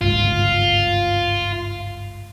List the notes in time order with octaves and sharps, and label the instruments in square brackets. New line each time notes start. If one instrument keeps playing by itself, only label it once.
[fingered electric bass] G1 C#2 G#2 [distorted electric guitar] F4